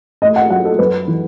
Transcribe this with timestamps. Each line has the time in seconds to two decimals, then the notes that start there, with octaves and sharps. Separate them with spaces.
0.22 A2 D#5
0.36 F#5
0.50 F#3 F#5
0.65 A4
0.79 F#2 B4
1.08 E3